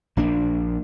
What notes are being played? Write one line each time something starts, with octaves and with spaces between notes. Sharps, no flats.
A#1 A#3 D4